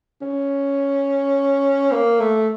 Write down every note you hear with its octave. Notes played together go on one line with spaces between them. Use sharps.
C#4
A#3
A3